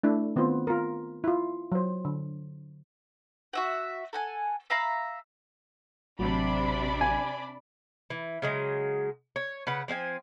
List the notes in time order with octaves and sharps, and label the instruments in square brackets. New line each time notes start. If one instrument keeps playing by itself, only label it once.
[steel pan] A3 D4 E4
D#3 B3 C4 F4 C5
F4 A#4
E4 F4
F#3 C5
D3
[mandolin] F#4 E5 F#5
A4 F#5 G#5
E5 F5 A#5 B5
[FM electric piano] A1 F#3 [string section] C3 [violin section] D4 D5 B5
[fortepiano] G#5
[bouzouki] E3
C#3 F#3 G#3
C#5
C#3 B4 F#5
F3 C4 F5 G#5